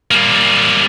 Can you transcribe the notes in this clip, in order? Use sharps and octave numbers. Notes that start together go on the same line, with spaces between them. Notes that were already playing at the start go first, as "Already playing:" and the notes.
G3 A#3